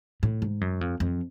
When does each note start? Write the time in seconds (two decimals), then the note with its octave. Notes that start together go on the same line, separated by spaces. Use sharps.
0.23 A2
0.42 G#2
0.61 F#2
0.81 F2
1.00 F2